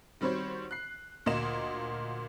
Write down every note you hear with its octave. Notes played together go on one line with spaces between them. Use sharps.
D#3 G3 C4 F#4 C5 C#5
F#6 C7
D2 A#2 A#3 A#4 D#5 E7